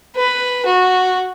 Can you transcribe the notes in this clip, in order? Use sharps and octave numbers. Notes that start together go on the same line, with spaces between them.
B4
F#4